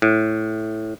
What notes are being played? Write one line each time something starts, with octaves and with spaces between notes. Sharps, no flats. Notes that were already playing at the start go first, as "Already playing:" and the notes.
A2